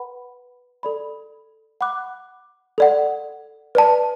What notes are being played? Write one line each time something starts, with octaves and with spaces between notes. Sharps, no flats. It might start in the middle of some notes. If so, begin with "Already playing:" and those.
Already playing: B4 F#5 B5
A4 D5 B5
F#5 B5 D6 F#6
A4 D5 F#5
B4 D5 A5